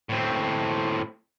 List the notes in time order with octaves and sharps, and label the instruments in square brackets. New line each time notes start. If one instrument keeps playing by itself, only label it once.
[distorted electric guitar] A2 C4